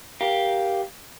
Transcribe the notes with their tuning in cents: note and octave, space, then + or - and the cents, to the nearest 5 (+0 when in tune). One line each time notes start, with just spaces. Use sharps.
G4 +0 A#4 +10 F5 +0